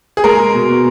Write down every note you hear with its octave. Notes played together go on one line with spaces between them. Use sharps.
G#4
G#3 A#4
G#3
B2
B2